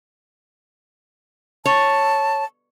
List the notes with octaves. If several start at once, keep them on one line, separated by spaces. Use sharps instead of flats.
C#5 A5